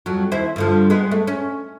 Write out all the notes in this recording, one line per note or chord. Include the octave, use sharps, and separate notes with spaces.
F2 F#3
D#2 E4 C5
G2 D3 F3
G#3 B3
A3
C#4